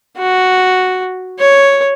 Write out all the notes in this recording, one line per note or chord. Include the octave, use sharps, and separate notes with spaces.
F#4
C#5